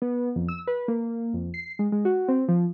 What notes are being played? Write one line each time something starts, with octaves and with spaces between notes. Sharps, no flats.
B3
F2
E6
B4
A#3
F2
C7
G#3
G#3
F#4
C4
F3